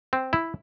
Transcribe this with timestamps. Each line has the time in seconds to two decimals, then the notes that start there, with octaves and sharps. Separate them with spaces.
0.13 C4
0.33 E4